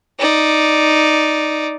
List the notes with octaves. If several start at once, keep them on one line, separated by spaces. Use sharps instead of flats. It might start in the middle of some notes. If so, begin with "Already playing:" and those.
D#4 D5